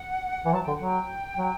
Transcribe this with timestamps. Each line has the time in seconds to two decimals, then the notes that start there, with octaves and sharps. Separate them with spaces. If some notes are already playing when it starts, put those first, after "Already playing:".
Already playing: F#5
0.45 E3
0.53 F#3 A5
0.64 D3 G5
0.75 F#5
0.81 F#3
0.86 G5
1.37 F#3